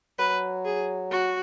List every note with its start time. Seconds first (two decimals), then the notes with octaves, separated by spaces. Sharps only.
0.19 F#3 B4
0.65 G#4
1.11 F#4